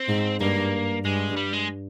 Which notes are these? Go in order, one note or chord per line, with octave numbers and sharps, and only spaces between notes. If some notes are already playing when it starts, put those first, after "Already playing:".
Already playing: C4
G#2
G2 A#3
G2 G#3
G3
G#3